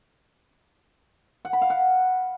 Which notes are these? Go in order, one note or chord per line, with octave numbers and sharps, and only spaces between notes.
F#5
B5
F5
F#5